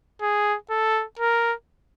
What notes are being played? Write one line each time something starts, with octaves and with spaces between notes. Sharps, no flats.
G#4
A4
A#4